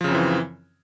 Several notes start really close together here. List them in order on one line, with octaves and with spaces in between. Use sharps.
F3 C#3 F#2 C4 E3